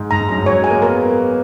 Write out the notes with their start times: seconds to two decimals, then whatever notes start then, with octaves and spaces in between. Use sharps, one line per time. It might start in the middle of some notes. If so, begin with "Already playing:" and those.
Already playing: G#2
0.11 G#2 A#5
0.21 G#2
0.29 F#2 A#5
0.38 G#2
0.46 F#3 C#5
0.59 G#3 G#5
0.70 A#3
0.82 B3 A#4